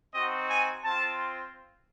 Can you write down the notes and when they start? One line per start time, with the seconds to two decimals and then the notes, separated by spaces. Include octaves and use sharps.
0.12 C4 D#4 F#4 D#5
0.49 G#5
0.84 C4 F4 A5